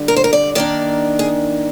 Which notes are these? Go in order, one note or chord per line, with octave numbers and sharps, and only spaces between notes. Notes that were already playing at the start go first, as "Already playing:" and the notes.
Already playing: D3 G3
A#4
C5
A#4
D5
D#3 A#3 D4 D5
G#4